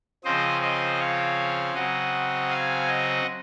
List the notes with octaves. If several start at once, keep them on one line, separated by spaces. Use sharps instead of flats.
C#3 F3 C4 C5 D#5
C5 D#5
C#5 F5
C#3 F#3 C4 D#5 F#5
F5 G#5
D#5 F#5